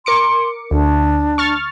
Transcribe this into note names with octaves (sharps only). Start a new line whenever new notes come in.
A#4 C6 D6 C#7
D2 D4
C#6 F6 A6